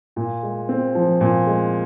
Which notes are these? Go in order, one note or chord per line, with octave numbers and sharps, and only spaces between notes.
A#2
G#3
C4
F3
A#2
G#3